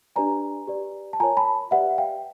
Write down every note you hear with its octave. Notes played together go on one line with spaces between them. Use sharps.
D4 G4 B4 D5 G#5 A#5
G4 B4 D5
A5
F4 A#4 C#5 G#5 A#5
A5 B5
G4 B4 D5 E5 F#5
F5 G5